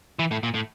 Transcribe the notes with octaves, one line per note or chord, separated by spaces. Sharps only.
E3
A2
A#2
A2